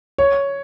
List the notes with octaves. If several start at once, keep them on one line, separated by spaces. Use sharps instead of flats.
C#5